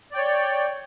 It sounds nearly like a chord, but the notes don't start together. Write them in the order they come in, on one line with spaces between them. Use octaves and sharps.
D5 G5 C#5